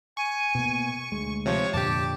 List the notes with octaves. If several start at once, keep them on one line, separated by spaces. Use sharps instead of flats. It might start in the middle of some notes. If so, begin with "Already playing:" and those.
G#5 C#6
B2 A#3
D2 G#3
C3 F3 C#5
F2 A#2 D3 G4 A5 D6